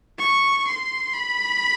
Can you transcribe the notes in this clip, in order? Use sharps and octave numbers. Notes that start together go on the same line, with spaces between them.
C#6
C6
B5